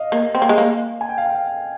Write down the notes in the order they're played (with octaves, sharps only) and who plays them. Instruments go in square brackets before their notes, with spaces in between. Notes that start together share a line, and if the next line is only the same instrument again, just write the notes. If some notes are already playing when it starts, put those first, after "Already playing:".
Already playing: [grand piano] D#5 F5
[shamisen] A#3
C4
A#3
G#3
A#3
[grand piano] G#5
G5
F5
G5
F5